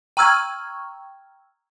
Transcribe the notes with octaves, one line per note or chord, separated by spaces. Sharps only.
G5 A#5 C#6 E6 F6 G#6